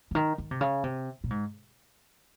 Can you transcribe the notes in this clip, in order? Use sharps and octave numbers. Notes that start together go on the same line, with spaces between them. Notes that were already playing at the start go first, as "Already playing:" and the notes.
C#3
D#3
D#3
C3
C#3
C3
A#2
G#2